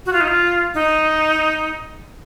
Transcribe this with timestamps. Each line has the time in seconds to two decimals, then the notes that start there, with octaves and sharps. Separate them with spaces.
0.06 F#4
0.13 F4
0.21 D#4
0.28 F4
0.74 D#4